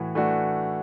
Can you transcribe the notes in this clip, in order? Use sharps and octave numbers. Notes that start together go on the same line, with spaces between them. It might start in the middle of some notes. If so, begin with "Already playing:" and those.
Already playing: A2 E3 F#4
E3 A3 D4 F#4